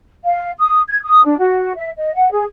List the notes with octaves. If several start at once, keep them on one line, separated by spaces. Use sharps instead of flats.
F5
D#6
G#6
D#6
D4
F#4
E5
D#5
F#5
G#4